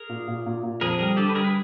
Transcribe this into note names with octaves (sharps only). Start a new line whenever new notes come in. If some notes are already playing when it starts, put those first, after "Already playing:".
Already playing: G#4 A#4
A#2
A#2
A#2
A#2
F2 G#4 A#4
G3 G#4 A#4
D3 G4 A4
B4
G3 G#4 A#4
B4